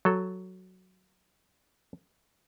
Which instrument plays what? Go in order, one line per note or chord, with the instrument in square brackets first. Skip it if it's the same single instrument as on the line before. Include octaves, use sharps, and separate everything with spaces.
[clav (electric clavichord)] F#3 A4